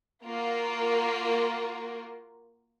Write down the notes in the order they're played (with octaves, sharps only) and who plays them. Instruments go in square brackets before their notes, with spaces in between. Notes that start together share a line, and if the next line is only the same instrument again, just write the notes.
[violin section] A#3 F4 F#4 A#4